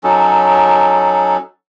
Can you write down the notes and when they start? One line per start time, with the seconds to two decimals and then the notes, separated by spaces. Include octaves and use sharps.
0.04 F#3 C#4 D#4 A4